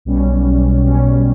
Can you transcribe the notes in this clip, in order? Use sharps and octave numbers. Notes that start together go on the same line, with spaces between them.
B1 B2 G3 C#4
B1 B2 G3 C#4